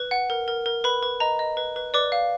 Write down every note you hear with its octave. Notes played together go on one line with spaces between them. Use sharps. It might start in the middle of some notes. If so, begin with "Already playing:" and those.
Already playing: B4
F#5
A#4
A#4
A#4
B4 B5
B4
D#5 A#5
D#5
B4
B4
B4 D5 D6
F5